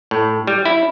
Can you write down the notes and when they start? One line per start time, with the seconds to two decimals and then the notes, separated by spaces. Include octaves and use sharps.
0.11 A2
0.47 G3
0.66 E4